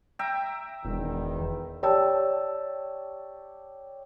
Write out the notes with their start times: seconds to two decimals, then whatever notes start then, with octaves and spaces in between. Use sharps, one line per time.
0.19 E5 G5 A#5
0.85 E1 E2 D#3
1.83 G4 C#5 D5 G5 A5 E6